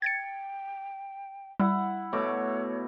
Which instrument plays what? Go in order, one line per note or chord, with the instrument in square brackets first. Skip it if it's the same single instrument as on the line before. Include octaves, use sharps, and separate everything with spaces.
[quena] G5 [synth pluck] G#6 A6 C#7
[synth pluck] G3 [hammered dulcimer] E4 F#5
[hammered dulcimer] B2 A3 D6 [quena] C#5